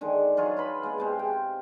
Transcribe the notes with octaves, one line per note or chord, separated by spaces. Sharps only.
D3 D#3 G#3
F#3 F4 G#4 C#5
F4 B4 B5 C6
G#3 B3
C3 G#3 C5
G5